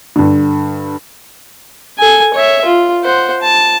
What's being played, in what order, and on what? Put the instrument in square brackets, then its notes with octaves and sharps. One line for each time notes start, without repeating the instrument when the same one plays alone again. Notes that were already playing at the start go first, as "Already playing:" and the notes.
[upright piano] G2 D3
[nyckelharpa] A4 G#5
C#5 E5
F4
C5 F#5
A5